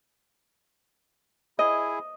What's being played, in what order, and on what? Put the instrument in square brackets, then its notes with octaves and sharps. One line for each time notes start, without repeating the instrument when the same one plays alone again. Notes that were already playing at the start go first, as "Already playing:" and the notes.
[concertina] E4 G#4 [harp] D#5